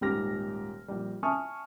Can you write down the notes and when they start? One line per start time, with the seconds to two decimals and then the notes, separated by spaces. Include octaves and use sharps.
0.01 D#1 G#2 G4 F6 A#6
0.88 A#1 G3
1.23 E5 G#5 A5 C#6 D#6 F6